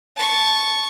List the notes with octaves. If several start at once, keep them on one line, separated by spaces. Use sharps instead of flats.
A5 C#6